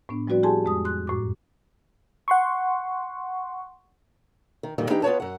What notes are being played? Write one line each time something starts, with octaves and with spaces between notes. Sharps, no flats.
A2 B3 D4
F3 G3 C4 F#4 B4 D5
E4 G4 G#4 G#5 A5 C6
F2 G#3 D#6
C6 F#6
F#2 A2 D6
F#5 C6 C#6
D#3
F2 A#2 D#3 G3
E3 D4 D#4 G4 G5
B3 F4 B4 C#5 A5
F#2 F#5